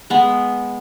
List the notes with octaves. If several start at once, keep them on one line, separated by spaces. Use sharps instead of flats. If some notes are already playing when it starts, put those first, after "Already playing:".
G#3 B3